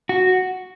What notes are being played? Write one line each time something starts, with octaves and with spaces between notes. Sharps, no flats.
F#4